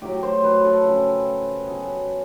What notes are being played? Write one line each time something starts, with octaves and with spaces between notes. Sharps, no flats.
A2 F#3 G4
C5
B4
A4
C#3 F3
B2 F#3 G#4